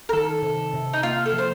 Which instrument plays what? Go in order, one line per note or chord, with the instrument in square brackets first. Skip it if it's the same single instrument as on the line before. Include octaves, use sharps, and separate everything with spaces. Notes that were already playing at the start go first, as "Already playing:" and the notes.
[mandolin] A#4
[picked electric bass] D#3 [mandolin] A4
[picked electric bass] C3
C3
[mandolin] D#4
[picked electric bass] A#3 [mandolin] F4
[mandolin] A4
[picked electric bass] F3
[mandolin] C5